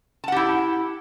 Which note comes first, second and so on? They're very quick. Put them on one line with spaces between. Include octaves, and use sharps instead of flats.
A5 F#5 G4 E4